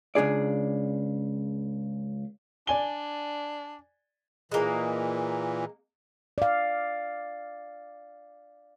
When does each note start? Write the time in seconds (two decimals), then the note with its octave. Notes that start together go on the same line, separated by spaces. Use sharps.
0.15 C#2 A#2 D4 G#4 D5
2.67 D4 D5 G#5 G7
4.52 A#2 E3 G#3 A#3
6.38 D5 F5